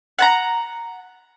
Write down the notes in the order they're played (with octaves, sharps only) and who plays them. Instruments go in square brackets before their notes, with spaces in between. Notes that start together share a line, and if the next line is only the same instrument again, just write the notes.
[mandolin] F#5 A5 A#5